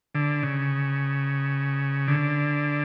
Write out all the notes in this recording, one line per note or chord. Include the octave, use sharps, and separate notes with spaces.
D3
C#3
D3